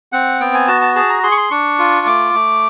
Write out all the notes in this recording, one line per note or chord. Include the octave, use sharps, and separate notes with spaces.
C4 F#5
B3 G5
G#5
F#4 A5
A5
G#4 A5
A#5
G#4 C6
C#6
C6
D4 C#6
F4
A3 D6
A3